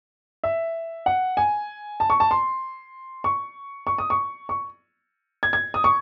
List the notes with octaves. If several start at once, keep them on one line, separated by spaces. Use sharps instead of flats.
E5
F#5
G#5
A5
C#6
A5
C6
C#6
C#6
D#6
C#6
C#6
G#6
G#6
D#6
C#6